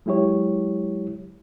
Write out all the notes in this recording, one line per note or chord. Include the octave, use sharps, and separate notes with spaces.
F#3 G#3 E4 G4 C#5